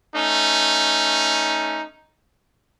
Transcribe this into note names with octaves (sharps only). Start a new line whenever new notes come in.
A3 C#4 D#4